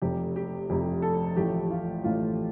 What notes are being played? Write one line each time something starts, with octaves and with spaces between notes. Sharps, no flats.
F1 F2 C3 G4
G4
F1 F2 C3 G4
A4
A1 A2 F3 A3 G4
F4
A1 A2 F3 A3 F4